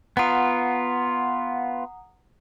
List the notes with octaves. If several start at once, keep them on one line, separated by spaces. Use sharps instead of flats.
B3 F4 F#5 A#5 D#6